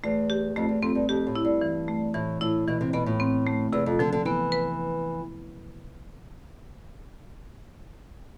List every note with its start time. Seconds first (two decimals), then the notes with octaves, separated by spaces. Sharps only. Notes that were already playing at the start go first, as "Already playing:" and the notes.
0.04 E2 A3
0.30 G4
0.56 F2 A3
0.69 E2
0.82 F2 C4
0.95 G2
1.09 F2 G4
1.27 A2
1.35 E4
1.45 G2
1.61 E3
1.88 A3
2.14 A2 E3
2.41 A2 E4
2.67 B2 E3
2.81 C3
2.93 B2 B3
3.06 A2
3.20 C4
3.47 A3
3.73 E2 C3
3.86 F2
3.99 D3 F3
4.12 D3
4.25 E3 B3
4.52 B4